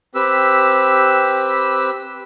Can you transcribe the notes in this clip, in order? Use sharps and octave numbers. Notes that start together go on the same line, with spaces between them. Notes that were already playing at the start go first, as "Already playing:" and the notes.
C4 G4 B4 E6